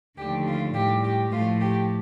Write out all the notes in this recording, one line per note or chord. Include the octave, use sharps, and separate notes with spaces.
D#2 D3 F3 A3 G4
F4
A2 G3 G4
G4
A2 F3 A3 F4
G4